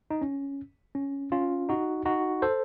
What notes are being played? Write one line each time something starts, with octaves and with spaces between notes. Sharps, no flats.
D#4
C#4
C#4
C#4 F4
D#4 F#4
D#4 F#4
A4 C5